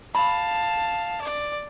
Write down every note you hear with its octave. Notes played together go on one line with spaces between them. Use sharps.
F5 A5 B5
D5